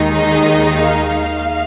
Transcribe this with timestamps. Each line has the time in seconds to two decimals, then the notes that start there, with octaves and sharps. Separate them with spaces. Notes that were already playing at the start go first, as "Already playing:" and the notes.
Already playing: D#2 D#3 G#3 D#4
0.17 D#5
0.81 F5